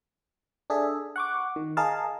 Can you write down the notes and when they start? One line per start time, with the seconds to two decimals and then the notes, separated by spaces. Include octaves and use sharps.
0.70 D4 G#4 A4 E5
1.16 F#5 C#6 D6
1.56 D#3
1.77 G#4 A#4 D#5 F5 A5